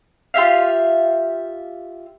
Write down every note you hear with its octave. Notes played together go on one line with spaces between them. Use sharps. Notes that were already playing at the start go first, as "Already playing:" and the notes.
F4 G4 E5 F5